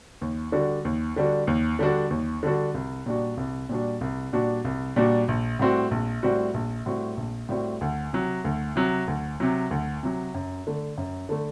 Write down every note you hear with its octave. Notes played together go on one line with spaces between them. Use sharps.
D#2
D3 G3 D4 F#4
D#2
D3 G3 D4 F#4
D#2
D3 G3 D4 F#4
D#2
D3 G3 D4 F#4
C2
A#2 G3 D4 F#4
C2
A#2 G3 D4 F#4
C2
A#2 G3 D4 F#4
C2
A#2 G3 D4 F#4
A#1
A2 G3 C4 F#4
A#1
A2 G3 C4 F#4
A#1
A2 G3 C4 F#4
A#1
A2 G3 C4 F#4
D2
C3 F#3
D2
C3 F#3
D2
C3 F#3
D2
C3 F#3
F#2
D3 A3
F#2
D3 A3